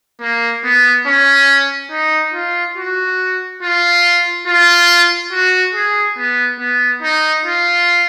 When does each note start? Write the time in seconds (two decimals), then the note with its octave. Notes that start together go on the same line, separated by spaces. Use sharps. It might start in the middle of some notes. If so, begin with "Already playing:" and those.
0.21 A#3
0.64 B3
1.06 C#4
1.91 D#4
2.34 F4
2.77 F#4
3.63 F4
4.47 F4
5.32 F#4
5.74 G#4
6.18 B3
6.60 B3
7.02 D#4
7.45 F4